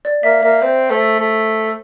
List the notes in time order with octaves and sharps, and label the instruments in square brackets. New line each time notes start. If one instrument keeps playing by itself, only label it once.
[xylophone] D5
[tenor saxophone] A#3 [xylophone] E5
[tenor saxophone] A#3 [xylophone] E5
[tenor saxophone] C4 [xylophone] C5
[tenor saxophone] A3 [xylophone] C5
[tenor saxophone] A3